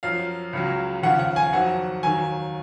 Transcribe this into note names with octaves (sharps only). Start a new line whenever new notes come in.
F#2 F3 F5
C#2 C#3 F#3
D#2 C#3 F3 F#5
F#5
G#5
F2 D#3 F#3 F#5
D#2 D#3 F#3 G#5